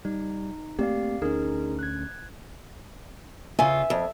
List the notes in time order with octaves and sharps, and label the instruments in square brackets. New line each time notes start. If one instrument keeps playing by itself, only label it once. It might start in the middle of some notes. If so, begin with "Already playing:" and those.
[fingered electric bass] G3 [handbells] D#4
[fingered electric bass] A3 A#3 C4 [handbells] G4 D5 F5
[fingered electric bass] D2 C#4 [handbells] D#4 G#4 A#4
[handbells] F#6 G#6
[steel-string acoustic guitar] C#3 F4 [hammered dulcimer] E5 [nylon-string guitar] G#5
[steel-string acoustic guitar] F2